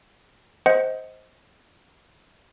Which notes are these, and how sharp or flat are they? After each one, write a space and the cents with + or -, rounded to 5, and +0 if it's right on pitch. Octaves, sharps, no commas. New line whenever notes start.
C5 +0 D#5 +20 F#5 +0